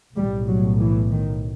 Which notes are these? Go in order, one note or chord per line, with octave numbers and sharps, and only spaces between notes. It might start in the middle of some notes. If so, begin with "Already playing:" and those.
B1 A2 G3
F#3
E3
D#3